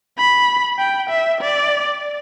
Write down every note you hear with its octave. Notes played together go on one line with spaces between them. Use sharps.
B5
G5
E5
D5